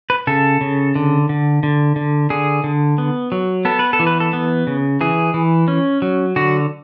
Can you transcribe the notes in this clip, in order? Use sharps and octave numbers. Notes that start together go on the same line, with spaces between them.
B4
C#3 A4
C#3
D3
D3
D3
D3
D3 G#4
D3
B3
F#3
B3 A4
B4
A4
E3
B4
A4
B3
C#3
E3 G#4
E3
C#4
F#3
D3 F#4